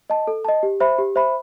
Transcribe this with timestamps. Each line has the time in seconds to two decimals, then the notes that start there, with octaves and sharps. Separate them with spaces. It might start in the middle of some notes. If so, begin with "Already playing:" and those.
0.10 D#5 A5
0.27 A4
0.45 D#5 A5
0.63 G4
0.80 C5 E5 B5
0.98 G4
1.16 C5 E5 B5